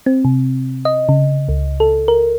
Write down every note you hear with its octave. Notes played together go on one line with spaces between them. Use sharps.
C4
C3
D#5
C#3
C#2
A4
A#4